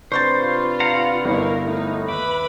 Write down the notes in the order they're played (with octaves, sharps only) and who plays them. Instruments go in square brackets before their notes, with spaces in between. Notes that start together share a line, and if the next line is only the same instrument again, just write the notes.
[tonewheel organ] C3 D4 B4 [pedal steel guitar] C5 [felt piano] C#6 G6 A6
[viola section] F4
[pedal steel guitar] F5 F#5 A#5
[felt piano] G1 [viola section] D#4 E4 A#4
[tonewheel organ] A3 E4 [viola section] D#4
[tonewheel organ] D#2 E5 D6 [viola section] B4 B5